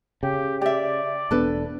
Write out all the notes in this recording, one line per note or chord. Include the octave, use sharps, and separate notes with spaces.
C#3 G4
G4 D5 E5
E1 B3 D4 A4 B4